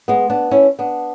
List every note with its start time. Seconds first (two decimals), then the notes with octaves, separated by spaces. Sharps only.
0.08 G#3 B3
0.30 B3 D4
0.51 C#4 E4
0.79 B3 D4